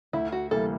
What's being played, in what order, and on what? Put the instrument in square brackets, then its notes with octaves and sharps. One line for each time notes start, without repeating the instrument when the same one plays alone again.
[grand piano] D2 [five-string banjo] E4
[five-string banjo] F#4
[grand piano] C3 E3 G3 A#3 [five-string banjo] A4